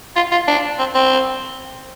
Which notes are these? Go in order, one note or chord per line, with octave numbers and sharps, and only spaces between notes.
F4
F4
D4
C4
C4